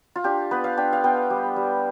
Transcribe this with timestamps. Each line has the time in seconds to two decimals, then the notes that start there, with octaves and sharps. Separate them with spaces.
0.16 F4
0.24 D4 G4
0.51 B3 B4
0.64 F5
0.77 D4 G5
0.93 F5
1.04 B3 G5
1.30 G3
1.56 G3